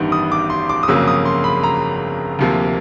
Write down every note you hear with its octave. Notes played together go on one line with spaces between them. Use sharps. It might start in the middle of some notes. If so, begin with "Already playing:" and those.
Already playing: A1 G2 D#3 G3 B3
D#6
D6
C6
D6
D#6
G1 F2 C#3 F#3 A#3 E6
D#6
C6
B5
A#5
D2 C3 F3 A#3